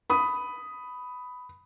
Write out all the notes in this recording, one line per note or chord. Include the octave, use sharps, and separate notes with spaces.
B5 D#6